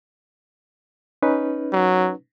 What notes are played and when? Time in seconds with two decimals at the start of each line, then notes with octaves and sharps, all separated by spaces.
1.22 C#4 D#4 B4
1.73 F#3